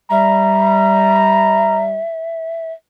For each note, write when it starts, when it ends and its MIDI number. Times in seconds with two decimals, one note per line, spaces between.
0.11 2.00 55
0.11 2.72 76
0.11 1.82 82